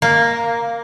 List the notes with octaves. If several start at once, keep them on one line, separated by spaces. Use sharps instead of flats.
A#3